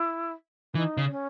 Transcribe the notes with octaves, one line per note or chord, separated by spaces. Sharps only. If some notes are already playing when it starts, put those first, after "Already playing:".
Already playing: E4
E3 D#4
C#3
C#4